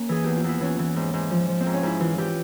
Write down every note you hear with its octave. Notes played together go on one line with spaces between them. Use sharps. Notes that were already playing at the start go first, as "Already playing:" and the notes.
Already playing: A#3 C#4
E3 G#4
E2 G4
F4
E2 E4
E3 C#4
E3
G#2
G#2
F3
F3
C4
G#2
C#4
G#2 E4
E3 F4
E3 G4